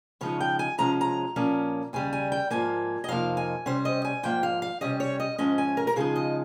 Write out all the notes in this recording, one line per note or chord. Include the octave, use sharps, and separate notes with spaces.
C#3 F3 G#3 D#4 C#5
G5
G#5
C3 F3 G#3 C#4 A#5
A#5
A#2 F3 A#3 C#4
D#2 C#3 G3 G#5
G#5
G5
G#2 F3 A#3 G#5
D#5
F2 C3 F3 A#3 D#4 F5
G#5
C3 G3 C#4 C5
D#5
G#5
G#2 F3 A#3 G5
F5
F5
C3 G3 C#4 D#5
C#5
D#5
G#2 F3 G#3 C#4 D#5
G#5
A#4
A#4
C#3 F3 G#3 D#4 G#4
D#5